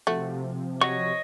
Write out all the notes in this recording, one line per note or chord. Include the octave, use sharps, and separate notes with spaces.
C3 F3 A3 F#4
F#3 C#5 D#5 C#6